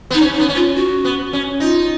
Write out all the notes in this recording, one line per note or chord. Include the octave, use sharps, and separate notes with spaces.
B3 D#4
C#4
D#4
B3
C#4
F4
F#4
B3
C#4
D#4 F4